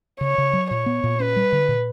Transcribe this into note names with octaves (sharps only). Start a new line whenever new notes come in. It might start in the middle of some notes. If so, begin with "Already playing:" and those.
C#3 C#5
C#3
F#3
A#2 C#5
B3
A#2
C#4 B4
G3
D3
A#2